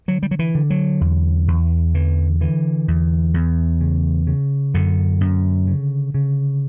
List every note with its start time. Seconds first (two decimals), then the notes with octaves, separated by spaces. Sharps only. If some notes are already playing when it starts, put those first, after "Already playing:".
0.08 D3 F#3
0.23 G3
0.31 F#3
0.39 E3
0.55 D3
0.70 F#3
1.01 E2
1.48 E2
1.95 D3 E3
2.41 D3 E3
2.88 E2
3.34 E2
3.81 C#3
4.27 C#3
4.74 F#2 D3
5.21 F#2
5.67 C#3
6.14 C#3